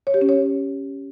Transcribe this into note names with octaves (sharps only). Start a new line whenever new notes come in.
C#5
G4
C#4
C#5